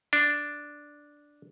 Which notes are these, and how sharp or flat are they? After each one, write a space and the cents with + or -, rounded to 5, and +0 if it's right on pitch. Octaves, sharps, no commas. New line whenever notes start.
D4 +0